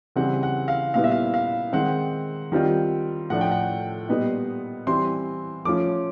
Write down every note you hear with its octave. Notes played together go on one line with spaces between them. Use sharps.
C#3 E3 G3 C4 F#5
F#5
F5
A#2 G3 B3 E4 F5
E5
F5
F5
D#3 G#3 C4 F#5
D#3 G3 C4 F4
A2 F3 A3 D4 F#5
G5
F#5
A#2 G3 B3 D#4
E3 G3 C4 E4 C6
F3 A3 C#4 F4 D6